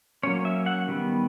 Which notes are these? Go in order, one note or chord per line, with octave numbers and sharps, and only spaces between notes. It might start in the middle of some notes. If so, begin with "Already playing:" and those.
F#3 A#3 C#4 C#5
E5
F#5
D#3 G3 B3